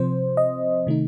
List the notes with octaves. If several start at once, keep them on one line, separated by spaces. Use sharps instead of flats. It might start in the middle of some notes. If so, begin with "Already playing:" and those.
Already playing: C3 F3 C4 C5
D#5
C3 D#3 A3 D#4